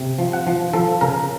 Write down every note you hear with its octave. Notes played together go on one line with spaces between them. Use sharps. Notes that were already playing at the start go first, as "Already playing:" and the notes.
Already playing: C3
F3
F#5
F3
F3 A4
C#3 A#4